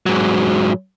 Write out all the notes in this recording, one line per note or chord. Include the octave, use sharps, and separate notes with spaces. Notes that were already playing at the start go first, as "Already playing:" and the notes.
G#2 F#3